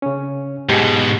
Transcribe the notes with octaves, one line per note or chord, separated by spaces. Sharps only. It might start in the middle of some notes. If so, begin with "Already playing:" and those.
C#3 C#4
G#2 B2 G4 G#4